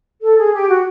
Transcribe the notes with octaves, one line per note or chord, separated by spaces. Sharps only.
A4
G#4
G4
F#4